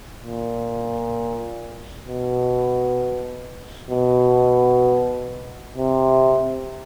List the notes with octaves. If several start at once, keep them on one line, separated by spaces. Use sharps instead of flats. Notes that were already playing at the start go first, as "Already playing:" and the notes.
A#2
B2
B2
C3